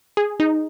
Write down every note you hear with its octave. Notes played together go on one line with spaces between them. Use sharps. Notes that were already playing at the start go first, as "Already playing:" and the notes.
G#4
D#4